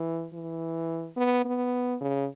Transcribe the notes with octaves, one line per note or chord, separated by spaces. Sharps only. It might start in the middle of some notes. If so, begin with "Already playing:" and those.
Already playing: E3
E3
B3
B3
C#3